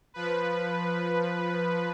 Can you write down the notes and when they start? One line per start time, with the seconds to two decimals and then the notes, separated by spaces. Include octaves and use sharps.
0.14 F3 B4